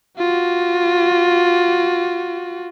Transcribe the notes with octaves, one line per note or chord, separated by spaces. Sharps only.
F4 F#4